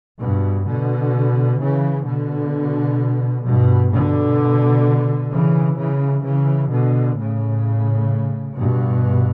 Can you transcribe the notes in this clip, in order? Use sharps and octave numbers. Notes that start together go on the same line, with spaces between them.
G2 B2
B2 D3
C#3 E3
B2 D3
G2 B2
B2 D3
C#3 E3
C#3 E3
C#3 E3
B2 D3
A2 C#3
G2 B2